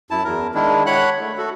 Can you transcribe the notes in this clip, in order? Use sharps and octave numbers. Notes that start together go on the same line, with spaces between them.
F#2 E4 A5
E2 A#4
D#3 G#3 D4 E4
C#5 F#5 B5 F#6
A3
F#4 A4